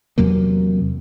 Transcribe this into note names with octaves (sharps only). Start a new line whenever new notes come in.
E2 C3 F#3 A#3